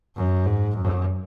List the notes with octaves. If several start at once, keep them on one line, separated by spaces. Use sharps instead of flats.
F#2
G#2
F#2